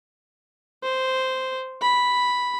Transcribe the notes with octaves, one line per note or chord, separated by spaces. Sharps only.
C5
B5